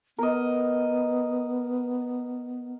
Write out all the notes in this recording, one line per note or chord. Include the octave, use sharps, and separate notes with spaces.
B3 A#4 D#5